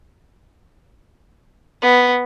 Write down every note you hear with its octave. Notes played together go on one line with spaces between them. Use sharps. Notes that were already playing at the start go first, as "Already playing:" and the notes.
B3